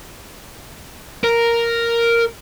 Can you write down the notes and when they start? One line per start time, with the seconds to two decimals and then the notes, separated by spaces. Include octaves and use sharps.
1.23 A#4